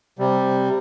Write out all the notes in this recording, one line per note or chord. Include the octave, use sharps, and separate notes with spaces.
C3 G3